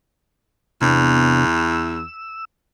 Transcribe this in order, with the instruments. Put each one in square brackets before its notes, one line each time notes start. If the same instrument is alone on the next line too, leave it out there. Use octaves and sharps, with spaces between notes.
[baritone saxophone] E2 [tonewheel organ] C3 B3 D4
[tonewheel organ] E6